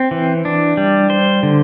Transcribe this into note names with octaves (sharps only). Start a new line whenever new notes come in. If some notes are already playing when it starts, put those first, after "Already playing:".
Already playing: C4
E3
D4
G3
C5
D3